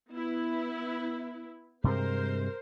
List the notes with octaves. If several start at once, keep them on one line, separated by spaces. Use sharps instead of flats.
B3 E4
G2 C3 G#3 A#4 C5